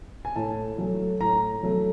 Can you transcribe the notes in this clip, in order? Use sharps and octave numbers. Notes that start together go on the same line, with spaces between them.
G#5
A2 A5
F#3 A3
A2 A#5
F#3 A3